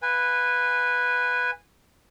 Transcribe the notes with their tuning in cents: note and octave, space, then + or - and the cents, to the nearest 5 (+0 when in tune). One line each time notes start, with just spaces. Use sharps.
B4 +0 F5 +0 G#5 -20